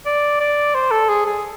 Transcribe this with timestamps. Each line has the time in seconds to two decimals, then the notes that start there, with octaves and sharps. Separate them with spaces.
0.06 D5
0.40 D5
0.75 C5
0.91 A4
1.09 G#4
1.26 G#4